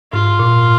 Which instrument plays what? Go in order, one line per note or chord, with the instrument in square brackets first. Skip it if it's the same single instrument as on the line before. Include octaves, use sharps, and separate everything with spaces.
[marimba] G#2 [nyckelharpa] F4
[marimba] A#2